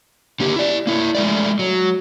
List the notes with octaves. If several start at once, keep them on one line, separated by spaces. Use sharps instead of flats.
D3 A#3 G4
E4 D5
A#3 E4
G#3 A3 D5
F#3